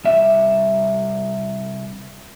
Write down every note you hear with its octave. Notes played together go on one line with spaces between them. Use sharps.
C2 E5